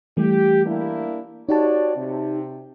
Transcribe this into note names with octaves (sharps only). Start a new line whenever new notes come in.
E3 G3 A3 G4
A#3 D4 E4
D#4 F#4 G4 C#5 D5 A5
C3